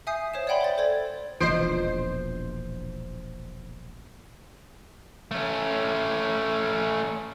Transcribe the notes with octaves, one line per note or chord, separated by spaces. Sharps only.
E5 G#5 D#6 G6 C7
C5 C#5 E5 E7
D5 E5 F#5 G5 B5 C6
C5 C6 A6
A4 C5 D5 G#6
E1 A#1 E3 F4 C5 D#5
A3 C#4